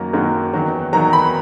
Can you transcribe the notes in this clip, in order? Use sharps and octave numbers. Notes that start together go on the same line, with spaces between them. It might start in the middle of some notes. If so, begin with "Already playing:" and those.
Already playing: F#2 D#3 F#3 A#3 A#5
F#2 D#3 F#3 A#3
E2 D#3 F#3
E2 D#3 F#3 A#5
B5